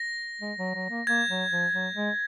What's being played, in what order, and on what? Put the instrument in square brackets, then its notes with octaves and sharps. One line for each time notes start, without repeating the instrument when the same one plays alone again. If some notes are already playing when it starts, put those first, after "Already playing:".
Already playing: [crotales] A#6
[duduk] G#3
F#3
F#3
A#3
[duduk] A#3 [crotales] G#6
[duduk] F#3
F3
F#3
G#3